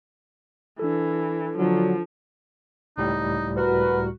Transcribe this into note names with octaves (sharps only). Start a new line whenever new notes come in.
E3 D4 A4
D3 F3 F#3
C#2 A2 G3 D#4
F#4 A#4 B4